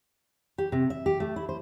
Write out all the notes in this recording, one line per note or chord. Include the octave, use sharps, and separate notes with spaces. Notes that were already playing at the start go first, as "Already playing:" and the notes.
G4
C3
E5
G4
A3
E4
C5